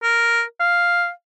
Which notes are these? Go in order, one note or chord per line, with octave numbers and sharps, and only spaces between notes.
A#4
F5